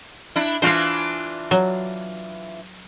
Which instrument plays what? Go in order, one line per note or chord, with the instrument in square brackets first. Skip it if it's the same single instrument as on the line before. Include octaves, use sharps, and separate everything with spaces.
[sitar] D4 E4
[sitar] E3 D4 F4 [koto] C5 F5
[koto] F#3